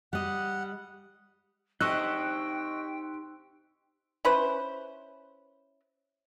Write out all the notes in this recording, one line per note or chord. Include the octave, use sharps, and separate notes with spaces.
G3 D#5 F#5
D#4 G4 C5 D#5 G5 C#6 E6 F#6
C#4 E4 B4 C5